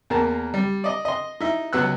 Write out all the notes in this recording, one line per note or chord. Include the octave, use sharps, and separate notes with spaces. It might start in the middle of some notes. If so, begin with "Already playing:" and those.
E2 A#3 A#4 A5
G3
D5 D#5
D#5 C6
D#4 E4 E5
C#2 F#3 B3 E6 F#6